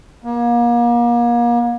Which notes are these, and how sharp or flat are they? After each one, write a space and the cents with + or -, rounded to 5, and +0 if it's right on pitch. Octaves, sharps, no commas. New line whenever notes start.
A#3 +35